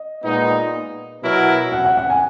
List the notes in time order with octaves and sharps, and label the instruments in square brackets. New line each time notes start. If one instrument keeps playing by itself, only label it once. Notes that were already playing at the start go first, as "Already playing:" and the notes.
Already playing: [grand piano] D#5
[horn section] A#2 G#3 B3 D#4
B2 F#3 B3 E4 A#4
[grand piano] F#5
F#5
F#5
G#5